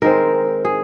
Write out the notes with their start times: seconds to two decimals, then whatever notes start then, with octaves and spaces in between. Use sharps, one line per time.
0.02 D#3 G#3 C4 A#4
0.65 G#4